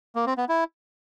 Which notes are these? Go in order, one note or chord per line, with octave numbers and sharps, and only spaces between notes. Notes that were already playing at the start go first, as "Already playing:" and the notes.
A#3
C4
B3
E4